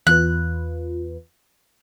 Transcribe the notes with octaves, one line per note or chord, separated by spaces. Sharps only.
E2 F4 B4 F#6